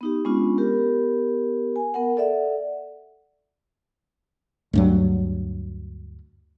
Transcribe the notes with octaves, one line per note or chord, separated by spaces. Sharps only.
B3 D#4 G4
G#3 B3 C#4 D4 F4
B3 G4 A#4
G#5
B3 A#4 F#5
A4 D5 E5 F#5
D2 G2 F#3